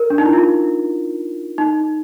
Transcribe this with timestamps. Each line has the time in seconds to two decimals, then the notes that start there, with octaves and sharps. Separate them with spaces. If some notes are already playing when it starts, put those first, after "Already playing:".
Already playing: A#4
0.10 D4
0.18 D#4
0.26 E4
0.33 F4
1.58 D#4